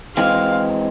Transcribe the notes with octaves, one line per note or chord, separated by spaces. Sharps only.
E3 G#3 C4 F5